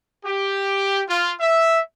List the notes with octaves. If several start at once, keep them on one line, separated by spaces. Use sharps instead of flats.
G4
F4
E5